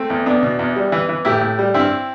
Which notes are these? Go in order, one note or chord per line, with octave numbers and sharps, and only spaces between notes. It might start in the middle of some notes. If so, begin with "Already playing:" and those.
Already playing: A3 C4
E2
E2 B3 D4
B2
E2
G3
E3
E3
A2 E4 G4
A2
G3
G2 C4 E4